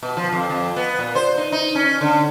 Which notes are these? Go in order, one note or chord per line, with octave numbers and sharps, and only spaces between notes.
B2
F3
F2
F2
B3
A#2
C5
D#4
D#4
C#4
D3